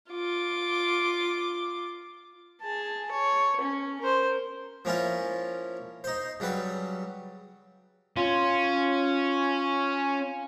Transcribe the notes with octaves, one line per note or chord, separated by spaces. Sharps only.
F4 D6
G#4 A5
C#5
C#4
A#4 C5
F3 A#3 C#4 E4 F4
D#4 C5
C#3 F#3 G3 B4
C#4 F4